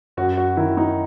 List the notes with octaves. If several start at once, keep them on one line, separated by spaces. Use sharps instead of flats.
F#2 F#4
F#4
D#3 E4
D#4